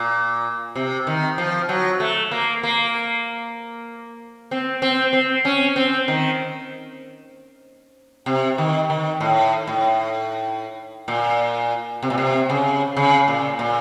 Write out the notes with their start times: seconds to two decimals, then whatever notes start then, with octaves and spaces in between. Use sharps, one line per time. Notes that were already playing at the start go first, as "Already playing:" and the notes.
Already playing: A#2
0.76 C3
1.07 D#3
1.38 F3
1.69 F#3
2.00 A3
2.31 A#3
2.63 A#3
4.51 C4
4.82 C4
5.13 C4
5.45 C#4
5.76 C4
6.08 D#3
8.26 C3
8.58 D#3
8.90 D#3
9.20 A2
9.67 A2
11.08 A#2
12.03 C3
12.10 A#2
12.18 C3
12.50 C#3
12.97 C#3
13.28 A#2
13.59 A#2